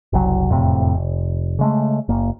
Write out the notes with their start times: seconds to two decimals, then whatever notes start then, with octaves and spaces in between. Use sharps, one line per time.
0.13 F#1 C2 F#3
0.49 E1 F2 A2 C3
0.94 F1
1.59 C#3 G#3 A3
2.09 F#1 A#3